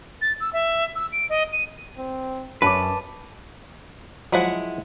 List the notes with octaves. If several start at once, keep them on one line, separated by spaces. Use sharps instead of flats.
A6
E6
E5
E6
D7
D#5
D#7
C4
F#2 C#4 B4 A5 D6
F3 F#3 G#3 E4 F#5